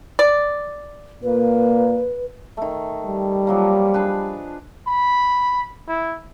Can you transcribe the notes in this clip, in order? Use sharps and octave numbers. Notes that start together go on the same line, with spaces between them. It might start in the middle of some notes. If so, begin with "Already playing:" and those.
D5
A#2 A#3 B4
D#3 A3
G3
F3 F#3 A#3
D4 G#4 B4
B5
E4